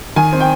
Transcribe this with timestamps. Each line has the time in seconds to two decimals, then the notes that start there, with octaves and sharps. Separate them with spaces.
0.16 D#3 G#5
0.33 C4
0.40 G5